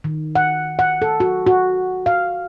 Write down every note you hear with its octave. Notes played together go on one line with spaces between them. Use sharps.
D#3
F#5
F#5
A4
F#4
F#4
F5